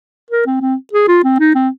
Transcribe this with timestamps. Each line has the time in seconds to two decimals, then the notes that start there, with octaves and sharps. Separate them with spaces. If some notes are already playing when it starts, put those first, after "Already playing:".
0.31 A#4
0.46 C4
0.61 C4
0.93 G#4
1.08 F4
1.24 C4
1.39 D#4
1.55 C4